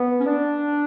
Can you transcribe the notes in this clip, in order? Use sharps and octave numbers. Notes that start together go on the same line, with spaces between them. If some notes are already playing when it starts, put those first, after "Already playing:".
Already playing: B3
C#4
D4